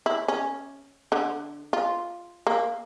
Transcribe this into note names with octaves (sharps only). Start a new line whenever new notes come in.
E4
C#4
D3
F4
A#3